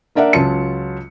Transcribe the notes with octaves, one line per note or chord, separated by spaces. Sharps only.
A#3 D4 A#4 D5 E5 F#5
C#2 F#3 C#4 F4 A5 C#7